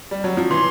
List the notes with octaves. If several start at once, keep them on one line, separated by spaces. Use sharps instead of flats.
G3
F#3
F3
E3 C6